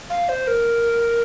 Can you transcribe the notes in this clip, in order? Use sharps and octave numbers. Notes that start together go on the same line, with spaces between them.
F5
C5
A#4